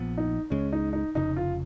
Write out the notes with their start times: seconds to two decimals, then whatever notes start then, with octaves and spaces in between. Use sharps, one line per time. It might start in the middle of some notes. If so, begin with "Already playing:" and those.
Already playing: A#1 A#2 F3 B3
0.18 D#4
0.50 C#2 C#3 G#3 C#4
0.73 D#4
0.93 D#4
1.15 F1 F2 C#3 D#4
1.37 F4